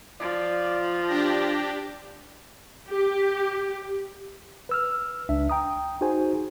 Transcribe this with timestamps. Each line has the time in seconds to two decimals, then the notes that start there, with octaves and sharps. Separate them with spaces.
0.20 F3 D5
1.08 D4 G4 A#6
2.89 G4
4.69 B4 E6 F6
5.29 C#2 D4 E5
5.50 G5 A#5 D#6
6.01 D#4 F#4 G#4 C5 G#5